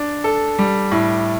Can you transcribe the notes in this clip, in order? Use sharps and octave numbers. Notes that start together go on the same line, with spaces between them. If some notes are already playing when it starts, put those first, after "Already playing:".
Already playing: D4
A4
G3
A2